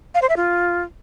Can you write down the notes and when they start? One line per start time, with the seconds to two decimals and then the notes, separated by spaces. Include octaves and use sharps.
0.15 F5
0.22 C5
0.29 E5
0.37 F4